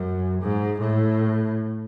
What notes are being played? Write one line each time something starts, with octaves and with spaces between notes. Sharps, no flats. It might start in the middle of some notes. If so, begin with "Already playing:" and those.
Already playing: F#2
G#2
A2